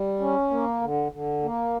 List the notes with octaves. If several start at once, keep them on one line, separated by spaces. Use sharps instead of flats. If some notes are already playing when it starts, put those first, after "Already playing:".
Already playing: G3
C#4
A#3
D3
D3
A#3